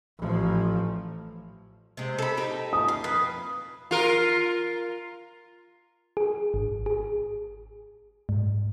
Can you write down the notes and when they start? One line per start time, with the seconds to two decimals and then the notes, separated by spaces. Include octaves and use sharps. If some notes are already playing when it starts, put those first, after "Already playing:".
0.19 A1 F3
1.97 C3 G#3
2.18 A4 B5
2.37 D#4 G4
2.73 D#6
2.88 F5
3.04 F2 B4 F5
3.91 F4 A#4
6.17 G#4
6.54 G#1
6.86 G#4
8.29 G#2